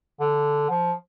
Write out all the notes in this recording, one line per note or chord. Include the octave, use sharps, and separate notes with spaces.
D3
F3